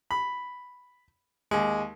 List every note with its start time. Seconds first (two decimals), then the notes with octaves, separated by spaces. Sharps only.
0.11 B5
1.51 D#2 G#3